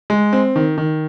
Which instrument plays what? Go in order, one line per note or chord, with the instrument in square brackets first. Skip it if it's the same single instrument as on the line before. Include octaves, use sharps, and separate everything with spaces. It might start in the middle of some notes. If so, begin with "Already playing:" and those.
[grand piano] G#3
C4
D#3
D#3